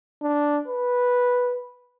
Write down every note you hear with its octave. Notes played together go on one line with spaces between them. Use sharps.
D4
B4